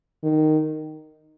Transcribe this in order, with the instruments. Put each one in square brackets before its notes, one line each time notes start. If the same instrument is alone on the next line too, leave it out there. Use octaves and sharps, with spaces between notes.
[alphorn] D#3